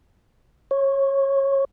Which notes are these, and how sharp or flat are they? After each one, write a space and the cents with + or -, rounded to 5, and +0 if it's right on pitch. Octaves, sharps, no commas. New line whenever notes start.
C#5 -20